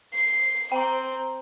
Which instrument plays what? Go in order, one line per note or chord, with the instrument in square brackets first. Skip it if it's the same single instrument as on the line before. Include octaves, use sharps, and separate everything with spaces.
[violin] C7
[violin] C4 [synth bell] G5 A#5